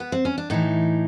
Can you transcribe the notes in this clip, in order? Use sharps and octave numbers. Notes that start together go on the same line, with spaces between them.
B3
C4
C#4
D4
A2 E3 D#4